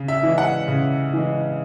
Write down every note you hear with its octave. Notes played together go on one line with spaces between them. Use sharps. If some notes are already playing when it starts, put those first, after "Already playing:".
Already playing: C#3
E5
E3 G#3
F#5
C#3
E3 G#3